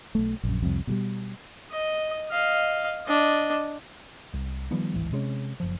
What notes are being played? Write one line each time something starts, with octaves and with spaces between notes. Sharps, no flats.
B1 A3
A#1 F#2
C2 F2
B2 F#3 G3
D#5
D#5 F5
D4 D#5
C2
D#3 F3 G3 B3
D1 G#1 E3
C3 G#3 C#4
F#1 F3